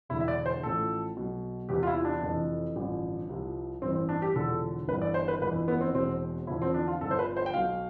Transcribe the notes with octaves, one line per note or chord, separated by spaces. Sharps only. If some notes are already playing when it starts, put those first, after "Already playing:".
E1 E2 D3 E4
E5
D5
C5
A1 A2 F3 A4
B1 B2
E2 C3 E3 G4
F4
E4
D4
F1 F2 E3
A1 G2 D3 F3
C2 C3 F3
A1 G2 E3 C4
C4
D4
G4
E1 E2 D3 F3 A4
G1 G2 E3 B4
D5
C5
B4
G1 F2 E3 B4
B3
C4
E1 E2 B2 C4
E2 D3 F3 E4
C4
D4
F4
G1 G2 D3 F3 A4
C5
B4
C5
G5
B1 B2 F5